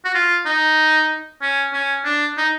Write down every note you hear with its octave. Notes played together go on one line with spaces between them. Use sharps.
F#4
F4
D#4
C#4
C#4
D4
D#4